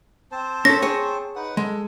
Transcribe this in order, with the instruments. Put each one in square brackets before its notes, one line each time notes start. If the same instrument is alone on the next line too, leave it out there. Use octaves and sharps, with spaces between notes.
[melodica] C4 C5 A5
[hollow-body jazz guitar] C#4 A4 [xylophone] A#6
[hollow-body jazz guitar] G#4 C#5
[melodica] D#4 B4 F#5
[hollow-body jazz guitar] G#3 [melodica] A4